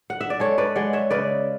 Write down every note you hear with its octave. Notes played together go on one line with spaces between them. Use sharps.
F#5
E5
D5
G#3 A4 C#5
B4 D5
G#3 D5 F#5
C#5 E5
C#3 B4 D5